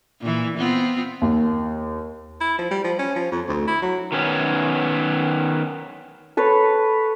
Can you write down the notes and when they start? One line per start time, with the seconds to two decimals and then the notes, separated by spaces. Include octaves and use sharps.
0.21 A#2 E3
0.57 B3 C4 F4
1.22 D#2
2.41 E4
2.59 F3
2.71 G3
2.84 F3
2.99 C#4
3.16 F3
3.32 F2
3.48 D2
3.68 E4
3.82 F#3
4.12 D#3 B3 C#4
6.37 A4 B4 C#5